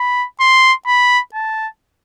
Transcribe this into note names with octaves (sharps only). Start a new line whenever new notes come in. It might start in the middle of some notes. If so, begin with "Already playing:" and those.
Already playing: B5
C6
B5
A5